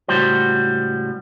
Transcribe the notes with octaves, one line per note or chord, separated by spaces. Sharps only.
C#2 A2 G3 F#4 C5